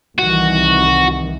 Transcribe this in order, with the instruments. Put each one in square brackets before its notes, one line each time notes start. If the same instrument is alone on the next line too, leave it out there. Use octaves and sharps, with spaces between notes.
[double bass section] C2 D#3 E3 [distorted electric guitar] F#4